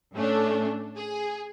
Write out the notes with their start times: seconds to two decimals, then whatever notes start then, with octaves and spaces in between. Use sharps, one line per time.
0.13 A2 A3 C#4 D4
0.97 G#4